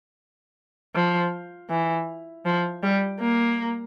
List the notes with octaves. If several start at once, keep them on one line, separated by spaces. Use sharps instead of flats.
F3
E3
F3
G3
A#3